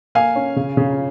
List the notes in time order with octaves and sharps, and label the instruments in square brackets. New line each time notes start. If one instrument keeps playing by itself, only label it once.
[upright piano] A#3 F5 G#5
C#4
C#3
C#3